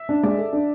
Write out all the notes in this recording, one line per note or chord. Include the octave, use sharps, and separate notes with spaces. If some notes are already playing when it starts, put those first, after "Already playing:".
Already playing: E5
D4
G#3 D5
A4
D4